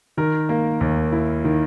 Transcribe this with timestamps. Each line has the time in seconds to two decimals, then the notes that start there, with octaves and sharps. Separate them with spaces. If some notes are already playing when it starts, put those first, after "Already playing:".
0.17 D#3 A#4
0.49 A#3
0.81 D#2
1.12 E4
1.45 D#3